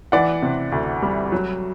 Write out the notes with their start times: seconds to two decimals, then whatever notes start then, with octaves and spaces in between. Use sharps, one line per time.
0.12 E3 D5 F#5
0.42 C3
0.72 D2
1.02 G3
1.32 F#3